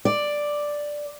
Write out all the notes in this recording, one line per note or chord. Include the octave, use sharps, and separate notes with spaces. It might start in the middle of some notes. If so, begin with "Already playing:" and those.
D5